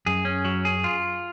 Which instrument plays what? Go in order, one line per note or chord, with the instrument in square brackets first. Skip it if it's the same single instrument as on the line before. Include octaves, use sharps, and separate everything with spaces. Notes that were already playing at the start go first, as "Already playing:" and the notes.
[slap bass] F#2 [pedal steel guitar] G#4
[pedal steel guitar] C#4
F#3
G#4
F4